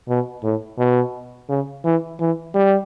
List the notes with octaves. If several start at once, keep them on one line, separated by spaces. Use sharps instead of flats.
B2
A2
B2
C#3
E3
E3
G3